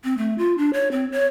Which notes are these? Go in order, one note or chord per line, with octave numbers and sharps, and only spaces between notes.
C4
A3
F4
D4
C#5
C4
C#5